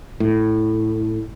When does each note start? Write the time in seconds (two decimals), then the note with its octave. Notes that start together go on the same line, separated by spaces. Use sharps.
0.20 A2